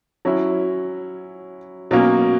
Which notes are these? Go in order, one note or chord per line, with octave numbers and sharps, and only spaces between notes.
F#3 C#4 E4
B2 F#3 A#3 C#4